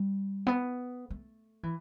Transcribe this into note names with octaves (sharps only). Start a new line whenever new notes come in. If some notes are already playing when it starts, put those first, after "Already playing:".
Already playing: G3
B3
A3
E3